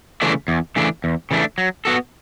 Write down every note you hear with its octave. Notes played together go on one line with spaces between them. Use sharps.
C#3 E3 A3 D4
E2
C#3 E3 A3 D4
E2
C#3 E3 A3 D4
F#3
B3 F#4 A4